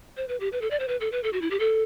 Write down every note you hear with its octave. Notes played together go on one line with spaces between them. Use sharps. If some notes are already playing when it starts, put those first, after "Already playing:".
C5
B4
G4
B4
A4
D5
C5
B4
A4
B4
A4
F#4
E4
G4
A4